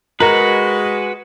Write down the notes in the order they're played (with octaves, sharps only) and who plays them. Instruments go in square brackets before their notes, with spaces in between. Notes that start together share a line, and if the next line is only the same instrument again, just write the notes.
[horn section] G#3 [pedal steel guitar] F#4 B4 [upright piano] A#4